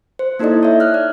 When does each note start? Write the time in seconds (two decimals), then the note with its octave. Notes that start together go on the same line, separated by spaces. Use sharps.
0.19 C5
0.39 A#3 D#4 E4 A4 D5 D#5
0.63 C#5 E5
0.80 F6 F#6
0.94 D5